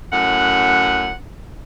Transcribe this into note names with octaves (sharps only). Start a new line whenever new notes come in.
F#2 A2 F#5